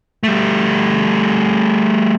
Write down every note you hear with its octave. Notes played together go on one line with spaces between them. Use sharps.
G3 A3